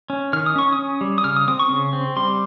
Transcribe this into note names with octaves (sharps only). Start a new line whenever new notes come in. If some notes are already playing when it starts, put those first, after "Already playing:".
C#4
D#3 F6
D#6
C#4 C#6
D#6
C#4
G3
D#6
C#3 F6
D#6
C4 D#6
C#6
C#3
C4
G3 C6